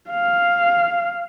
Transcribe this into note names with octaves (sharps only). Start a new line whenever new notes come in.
F5